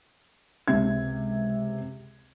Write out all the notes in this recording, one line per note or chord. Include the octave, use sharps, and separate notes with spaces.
C#2 C3 E5 G#6